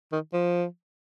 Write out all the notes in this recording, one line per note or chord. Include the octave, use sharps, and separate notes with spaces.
D#3
F3